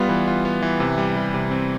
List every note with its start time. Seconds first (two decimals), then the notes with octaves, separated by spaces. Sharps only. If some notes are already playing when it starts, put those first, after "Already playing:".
Already playing: G3 B3 F4
0.09 E3
0.27 F4
0.45 B3
0.62 E3
0.80 C3
0.98 G3
1.16 G3
1.34 C3
1.51 C4